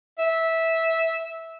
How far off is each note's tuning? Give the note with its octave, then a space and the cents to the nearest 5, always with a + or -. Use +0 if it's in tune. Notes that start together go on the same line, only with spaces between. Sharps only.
E5 -10